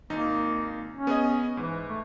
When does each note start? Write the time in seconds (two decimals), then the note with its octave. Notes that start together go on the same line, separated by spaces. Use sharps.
0.10 G#1 A#3 D#4
0.94 C#4
1.07 B3 G#4 D#5
1.57 G#2 E3
1.88 A3